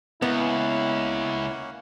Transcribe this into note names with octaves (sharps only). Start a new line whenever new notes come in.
C#2 A#3 B3 C#4 E4 F#5